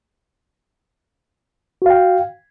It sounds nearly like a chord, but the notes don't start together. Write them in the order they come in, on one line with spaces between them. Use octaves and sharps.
F#4 F5 G5